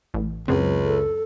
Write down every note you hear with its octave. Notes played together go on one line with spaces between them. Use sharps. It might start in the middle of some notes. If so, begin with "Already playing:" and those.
A1
C#2 F#2 C#3 C4
A4